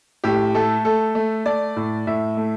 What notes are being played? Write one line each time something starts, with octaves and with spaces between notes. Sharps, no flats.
A2 G4
A3 A4
A3 A4
A3
A3 D5
A2
A2 E5
A3